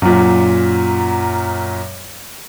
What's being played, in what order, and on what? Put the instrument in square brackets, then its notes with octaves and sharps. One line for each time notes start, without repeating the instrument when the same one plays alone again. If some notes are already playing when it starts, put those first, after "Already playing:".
[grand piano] F#2 A#2